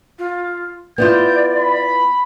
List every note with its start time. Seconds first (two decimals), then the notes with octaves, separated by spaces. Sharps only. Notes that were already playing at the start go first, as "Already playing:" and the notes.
0.19 F4
0.98 B3 E4 F4 D5 G6
1.58 B5